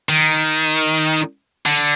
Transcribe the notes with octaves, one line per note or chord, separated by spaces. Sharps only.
D#3
D3